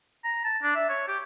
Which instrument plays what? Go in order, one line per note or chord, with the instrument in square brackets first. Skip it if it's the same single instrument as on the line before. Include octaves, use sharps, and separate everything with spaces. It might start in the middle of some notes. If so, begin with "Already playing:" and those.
[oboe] A#5
A5
D4
E5
C#5
G4